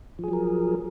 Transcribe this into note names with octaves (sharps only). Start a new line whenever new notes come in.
F3 F#3 G#4 A#4